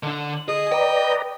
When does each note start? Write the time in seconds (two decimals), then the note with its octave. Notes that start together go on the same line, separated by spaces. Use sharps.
0.03 D3 D4
0.48 G#4 D#5
0.72 B4 D5 G5 A#5